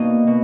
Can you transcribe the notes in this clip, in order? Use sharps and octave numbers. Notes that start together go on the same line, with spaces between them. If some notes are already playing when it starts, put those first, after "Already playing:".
Already playing: B2 A#3 D#4 D#5
B2